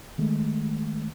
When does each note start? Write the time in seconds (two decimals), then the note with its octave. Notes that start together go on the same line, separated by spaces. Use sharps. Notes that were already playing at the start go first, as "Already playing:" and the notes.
0.18 D#3 G#3 A3